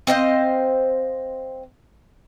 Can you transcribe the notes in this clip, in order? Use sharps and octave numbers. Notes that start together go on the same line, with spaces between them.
C4 C5 D#5 F5